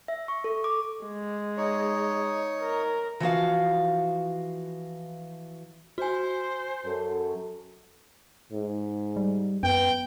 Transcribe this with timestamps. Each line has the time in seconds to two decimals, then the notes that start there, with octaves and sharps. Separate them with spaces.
0.08 E5
0.28 C#6
0.44 A4
0.64 D6
1.05 G#3
1.57 D#4 C#5
2.61 A#4
3.20 E3 F3 F#4 F5
5.98 F#4 C5 G#5
6.85 F#2 A4
8.53 G#2
9.17 G3
9.63 F#2 B3 G5